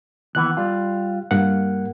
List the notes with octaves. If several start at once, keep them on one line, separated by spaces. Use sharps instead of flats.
D#2 E3 B3 F#6
G3 F4
G2 A#3 F#5